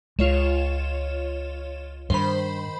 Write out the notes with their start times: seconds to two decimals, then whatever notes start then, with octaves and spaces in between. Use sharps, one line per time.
0.19 C#2 G#3 F4 C#5 E7
2.10 G2 D#3 C5 B5